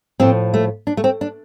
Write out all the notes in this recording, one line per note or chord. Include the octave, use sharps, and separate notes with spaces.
A2 F3 C4
A3
D4
A3
C4
D4